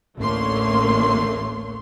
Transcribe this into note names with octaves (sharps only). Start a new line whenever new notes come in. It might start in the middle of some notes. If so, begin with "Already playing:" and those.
A1 D2 A3 A#3 C#5 C6